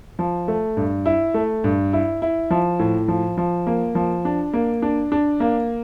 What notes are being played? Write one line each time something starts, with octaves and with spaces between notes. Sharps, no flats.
F3
A3
G2
E4
A3
G2
E4
E4
F3
A2
F3
F3
A#3
F3
D4
A#3
D4
D4
A#3